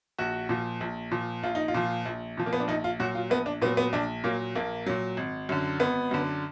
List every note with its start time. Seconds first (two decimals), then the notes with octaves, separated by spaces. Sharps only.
0.18 A#1 F#4
0.49 A#2 F3
0.81 A#1
1.11 A#2 F3
1.43 A#1 F4
1.55 D#4
1.68 F4
1.74 A#2 F3
2.05 A#1
2.37 A#2 F3
2.46 A#3
2.53 B3
2.60 D4
2.68 A#1 D#4
2.84 F4
3.00 A#2 F#3 F#4
3.15 F4
3.30 A#1 B3
3.46 D4
3.61 A#2 B3
3.65 F#3
3.77 B3
3.93 A#1 D4
4.24 A#2 F#3 A#3
4.55 A#1 A#3
4.86 A#2 F#3
5.17 G#1
5.49 F#2 D3
5.80 G#1 B3
6.11 F#2 D3